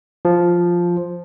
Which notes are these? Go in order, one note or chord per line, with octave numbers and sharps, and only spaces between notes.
F3